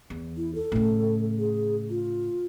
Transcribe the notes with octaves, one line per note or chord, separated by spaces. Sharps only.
E2
E4
A4
A2 C#3
G#4
F4